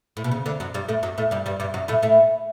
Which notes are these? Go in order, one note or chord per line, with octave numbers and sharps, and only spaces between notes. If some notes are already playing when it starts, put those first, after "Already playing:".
A2
B2
C#3
D2 D3
F#2 F#3
G2 G3
A2 A3
F#2 F#3
A2 A3
G2 G3
G2 G3
G2 G3
F#2 F#3
A2 A3
A2 A3